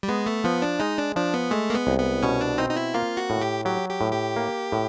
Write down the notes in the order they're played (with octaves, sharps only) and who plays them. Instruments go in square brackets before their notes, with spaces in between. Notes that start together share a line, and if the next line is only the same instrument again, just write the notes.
[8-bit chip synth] G3
[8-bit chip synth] G#3 [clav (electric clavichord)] B3
[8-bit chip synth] A3
[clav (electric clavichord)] F3 [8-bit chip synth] B3
[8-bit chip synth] D4
[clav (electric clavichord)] G#3 [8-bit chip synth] D#4
[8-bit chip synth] D4
[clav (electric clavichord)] F3 [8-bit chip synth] D4
[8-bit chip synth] B3
[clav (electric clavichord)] G#3 [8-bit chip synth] A3
[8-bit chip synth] A#3
B3
[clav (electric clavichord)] C2
[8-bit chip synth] B3
[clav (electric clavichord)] B2 [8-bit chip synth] C#4
[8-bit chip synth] D4
[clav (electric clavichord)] C4 [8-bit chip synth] D#4
[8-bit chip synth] D#4
E4
[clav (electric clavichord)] A#3 [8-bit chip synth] F4
[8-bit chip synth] F#4
[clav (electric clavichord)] A2
[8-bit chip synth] G4
[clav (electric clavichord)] F#3 [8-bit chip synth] G4
[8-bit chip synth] G4
[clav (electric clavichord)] A2
[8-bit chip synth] G4
[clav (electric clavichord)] A#3
A2